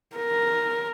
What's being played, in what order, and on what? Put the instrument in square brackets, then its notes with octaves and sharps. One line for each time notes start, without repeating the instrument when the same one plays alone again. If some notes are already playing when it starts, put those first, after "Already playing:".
[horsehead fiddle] A#4